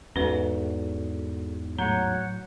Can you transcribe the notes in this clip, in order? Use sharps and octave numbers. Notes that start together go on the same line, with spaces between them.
E2 G#2 C#4 F#4 A4 B4
A2 F#3 F#4 C#5 F#5 A#5 G6